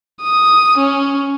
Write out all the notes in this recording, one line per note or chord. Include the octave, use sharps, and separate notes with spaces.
D#6
C#4